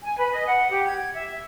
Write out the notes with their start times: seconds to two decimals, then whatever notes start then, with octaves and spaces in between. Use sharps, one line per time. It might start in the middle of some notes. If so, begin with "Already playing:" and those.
0.03 G#5
0.18 B4
0.32 D#5
0.46 F#5
0.70 G4
0.84 G#6
1.14 E5